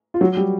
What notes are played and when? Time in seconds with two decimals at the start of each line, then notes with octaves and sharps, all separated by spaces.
0.14 F4
0.21 F#3 F#4
0.37 G3 G4